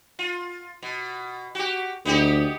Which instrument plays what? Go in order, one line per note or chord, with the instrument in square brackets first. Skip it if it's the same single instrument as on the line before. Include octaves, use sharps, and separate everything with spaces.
[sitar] F4
B2
F#4 G4
[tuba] D2 [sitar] B3 D#4 G4